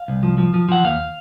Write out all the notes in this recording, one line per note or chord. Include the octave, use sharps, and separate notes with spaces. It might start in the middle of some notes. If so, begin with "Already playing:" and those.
Already playing: F5
C2
F3
F3
F3
F3 F#5
D#2 F5